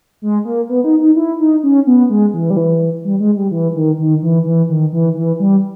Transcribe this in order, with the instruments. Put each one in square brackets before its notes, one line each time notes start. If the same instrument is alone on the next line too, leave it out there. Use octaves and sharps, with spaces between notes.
[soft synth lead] G#3
A#3
B3
D#4
D#4
E4
D#4
C#4
B3
G#3
E3
G3
E3
G3
G#3
G3
E3
D#3
D#3
E3
E3
D#3
E3
E3
G3